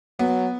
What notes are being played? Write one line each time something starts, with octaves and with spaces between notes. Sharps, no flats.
F#3 B3